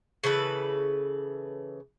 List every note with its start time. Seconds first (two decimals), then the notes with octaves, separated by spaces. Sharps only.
0.24 C#3 E3 A4 B4